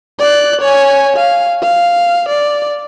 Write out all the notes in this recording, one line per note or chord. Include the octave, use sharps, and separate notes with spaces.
D5 F#6
C#5 G#5
F5
F5
D5